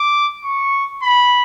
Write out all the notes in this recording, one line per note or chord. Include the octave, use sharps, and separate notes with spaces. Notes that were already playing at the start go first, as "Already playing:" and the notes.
Already playing: D6
C#6
B5